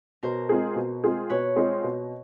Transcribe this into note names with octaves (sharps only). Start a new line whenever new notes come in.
B2 A#4 C5
G#3 C4 F4 G#4
B2
G#3 C4 F4 G#4
B2 B4 C#5
G#3 C4 F4 G#4
B2